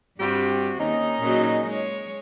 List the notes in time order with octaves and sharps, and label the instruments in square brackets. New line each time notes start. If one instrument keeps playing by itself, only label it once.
[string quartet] G2 C3 [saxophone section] G3 F#4 G4
[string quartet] D#2 [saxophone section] C#4 D#4
[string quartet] A#2 C#3 F#3
G#3 C#5